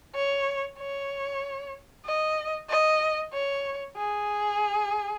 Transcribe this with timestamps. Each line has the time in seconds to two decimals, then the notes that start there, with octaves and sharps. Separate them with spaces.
0.15 C#5
0.79 C#5
2.05 D#5
2.70 D#5
3.33 C#5
3.97 G#4